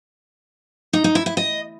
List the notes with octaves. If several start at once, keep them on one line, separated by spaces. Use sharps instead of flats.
D#4
D#4
E4
E4
D#5